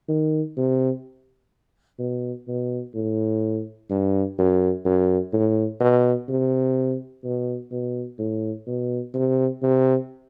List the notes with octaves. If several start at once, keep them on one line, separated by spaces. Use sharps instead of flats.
D#3
C3
B2
B2
A2
G2
F#2
F#2
A2
B2
C3
B2
B2
A2
B2
C3
C3